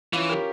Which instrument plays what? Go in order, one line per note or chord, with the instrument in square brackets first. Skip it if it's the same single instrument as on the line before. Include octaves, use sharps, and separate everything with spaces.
[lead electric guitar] E3 [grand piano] C#4 F4
[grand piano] G4 A#4